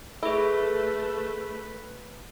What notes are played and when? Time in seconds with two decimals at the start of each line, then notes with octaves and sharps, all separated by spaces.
0.23 A3 E4 G#4 A4 B4